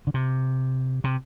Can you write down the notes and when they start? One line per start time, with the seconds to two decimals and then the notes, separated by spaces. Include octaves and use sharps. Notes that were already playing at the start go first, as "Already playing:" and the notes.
0.07 D3
0.14 C3
1.04 C3